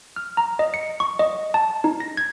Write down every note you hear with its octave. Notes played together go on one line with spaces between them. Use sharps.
F6
A#5
D#5
C#7
C#6
D#5
A5
D#4
A#6
G#6